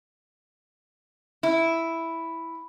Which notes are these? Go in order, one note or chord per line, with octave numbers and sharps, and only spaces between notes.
E4